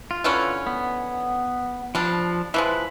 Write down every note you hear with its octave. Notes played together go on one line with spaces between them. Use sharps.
F4
D3 E3 C#4
B3
F3 G3 D4
E3 F3 G#3 B4